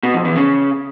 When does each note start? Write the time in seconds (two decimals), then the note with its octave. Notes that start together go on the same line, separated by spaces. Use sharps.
0.03 B2
0.14 F2
0.25 E2
0.36 C#3